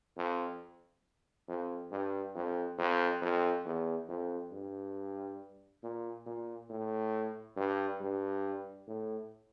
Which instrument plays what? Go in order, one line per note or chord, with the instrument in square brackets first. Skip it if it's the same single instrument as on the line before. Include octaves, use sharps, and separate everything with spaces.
[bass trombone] F2
F2
G2
F2
F2
F2
E2
F2
G2
A#2
A#2
A2
G2
G2
A2